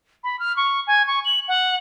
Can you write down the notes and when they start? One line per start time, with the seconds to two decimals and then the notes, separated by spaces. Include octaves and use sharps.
0.24 B5
0.39 F6
0.57 C#6
0.87 G#5
1.07 C#6
1.25 F#7
1.48 F#5